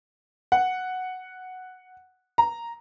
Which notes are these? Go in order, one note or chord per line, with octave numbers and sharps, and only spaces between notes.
F#5
A#5